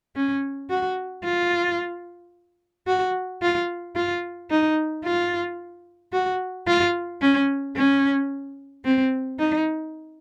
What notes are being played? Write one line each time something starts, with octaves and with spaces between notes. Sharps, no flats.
C#4
F#4
F4
F#4
F4
F4
D#4
F4
F#4
F4
C#4
C#4
C4
D#4